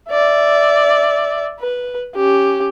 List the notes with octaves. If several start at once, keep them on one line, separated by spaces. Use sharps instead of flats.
D5 E5
B4
C#4 G4